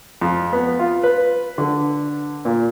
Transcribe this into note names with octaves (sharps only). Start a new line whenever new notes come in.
F2
B3
F4
B4
D3
A#2